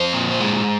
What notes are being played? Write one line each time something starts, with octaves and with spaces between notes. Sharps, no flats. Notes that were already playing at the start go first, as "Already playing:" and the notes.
Already playing: F2 C5
A#2
G#3